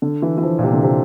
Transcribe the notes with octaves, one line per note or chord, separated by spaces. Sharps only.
D3
E3
E3
F3
A#2
C3
D3
C3